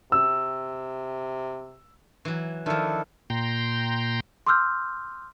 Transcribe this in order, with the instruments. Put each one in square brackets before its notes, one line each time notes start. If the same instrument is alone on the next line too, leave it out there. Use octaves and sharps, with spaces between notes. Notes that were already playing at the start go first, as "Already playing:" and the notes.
[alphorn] C3 [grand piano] E6
[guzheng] E3 F#3
[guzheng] D#3 F3 [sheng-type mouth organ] D4 E4 A4
[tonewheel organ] A#2 G5 A#5 C6
[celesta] C6 D6 E6 F6 G6